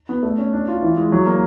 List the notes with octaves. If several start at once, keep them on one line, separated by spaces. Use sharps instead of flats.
B3
A3
C#4
D4
F4
E3
G#3
F#3
A#3